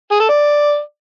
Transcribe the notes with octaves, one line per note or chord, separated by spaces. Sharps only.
G#4
A4
D5